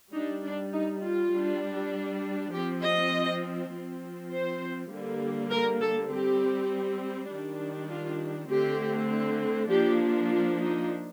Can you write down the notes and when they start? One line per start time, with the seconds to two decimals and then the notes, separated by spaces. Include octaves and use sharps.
0.13 G3 D4 D#4
0.43 D4
0.73 D#4
1.03 F4
1.33 G3 D4
2.52 F3 C4 G4
2.82 D#5
3.71 F3 C4
4.32 C5
4.91 D3 G3 A#3
5.51 A#4
5.81 A4
6.10 G3 C4 G4
7.30 D#3 G3 D4
7.90 F4
8.50 D3 A3 C4 G4
9.69 F3 A#3 D4 G4
10.29 F4
10.59 D#4